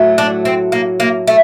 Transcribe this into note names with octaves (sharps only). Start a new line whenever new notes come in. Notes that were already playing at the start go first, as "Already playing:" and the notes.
Already playing: A2 F#3 A3
D4
C4
A#3
A#3
A3